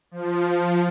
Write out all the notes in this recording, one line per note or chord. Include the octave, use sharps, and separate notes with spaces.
F3